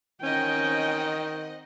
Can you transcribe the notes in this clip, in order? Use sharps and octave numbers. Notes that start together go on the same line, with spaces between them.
D#3 C4 C#4 D#5 F#5 G5